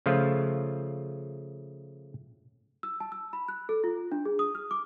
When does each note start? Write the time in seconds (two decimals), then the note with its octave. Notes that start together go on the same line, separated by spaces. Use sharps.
0.06 C#3 F3 A3 F4
2.83 E6
3.00 A5
3.12 E6
3.33 B5
3.48 F#6
3.69 A4
3.84 F4
4.12 D4
4.26 G#4
4.39 D#6
4.55 F6
4.71 D6